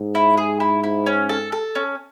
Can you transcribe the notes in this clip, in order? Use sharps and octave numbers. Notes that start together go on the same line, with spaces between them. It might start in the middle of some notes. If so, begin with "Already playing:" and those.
Already playing: G#2
E4
G#4
E4
E4
C#4
A4
A4
C#4